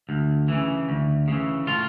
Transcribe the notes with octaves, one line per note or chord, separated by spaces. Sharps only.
D2
C#3 E3
D2
C#3 E3
A2 F4